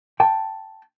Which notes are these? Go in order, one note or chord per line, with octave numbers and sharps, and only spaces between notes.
G5 A5